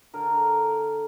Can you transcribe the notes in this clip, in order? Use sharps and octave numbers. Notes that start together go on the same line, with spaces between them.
D3 A#4